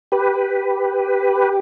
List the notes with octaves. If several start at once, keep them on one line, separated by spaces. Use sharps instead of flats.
G4 B4